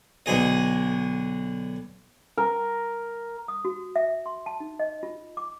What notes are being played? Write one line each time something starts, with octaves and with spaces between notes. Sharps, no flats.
B1 D3 G#4 D#5
A#4
D#6
F#4
E5
C6
A5
D#4
D#5
F4
D6